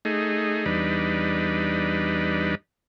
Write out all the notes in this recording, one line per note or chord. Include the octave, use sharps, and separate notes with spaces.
A3 D#4 G#4
E2 G3 D4 D#4 B4